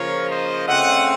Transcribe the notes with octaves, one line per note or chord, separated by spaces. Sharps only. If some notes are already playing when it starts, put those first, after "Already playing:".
Already playing: C#3 F3 A#3 F4 A#4 C#5
C5 D#5
C#3 A3 C4 D#5 F#5